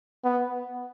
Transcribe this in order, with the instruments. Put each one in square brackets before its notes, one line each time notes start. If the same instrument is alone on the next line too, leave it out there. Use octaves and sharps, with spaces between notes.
[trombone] B3